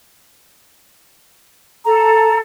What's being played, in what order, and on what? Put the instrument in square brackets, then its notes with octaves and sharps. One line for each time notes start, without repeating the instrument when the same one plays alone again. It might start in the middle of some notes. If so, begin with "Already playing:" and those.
[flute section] A4 [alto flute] A#5